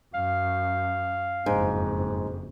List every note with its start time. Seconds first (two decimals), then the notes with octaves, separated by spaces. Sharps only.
0.14 F#2 F5
1.46 F#1 F2 G#2